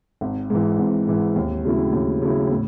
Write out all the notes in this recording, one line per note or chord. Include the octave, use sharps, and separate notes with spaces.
G#1
G#2 E3
G#1
G#2 E3
D#2
C#3 F#3 A3 E4
D#2
C#3 F#3 A3 E4
A2